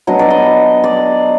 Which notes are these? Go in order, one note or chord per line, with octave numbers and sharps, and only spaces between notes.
F#3 B3 D4 D#5
D5
D#5
D5